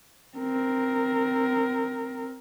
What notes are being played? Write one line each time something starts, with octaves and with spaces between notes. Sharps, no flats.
C4 A#4